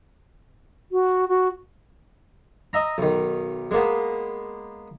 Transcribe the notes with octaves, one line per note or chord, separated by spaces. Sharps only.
F#4
F#4
D#5 E5 A#5
B1 D#3
G#3 A#3 B3